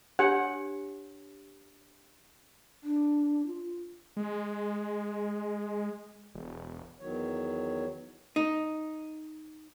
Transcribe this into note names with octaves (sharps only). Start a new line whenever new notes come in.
D4 G4 C#5 F#5
D4
F4
G#3
E1
E2 D#3 F#3 C#5
D#4